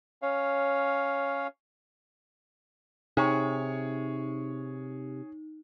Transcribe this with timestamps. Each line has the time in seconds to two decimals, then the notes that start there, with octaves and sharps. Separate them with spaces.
0.22 C#4 C#5 F5
3.17 C3 D#4 G#4 C#5 C#6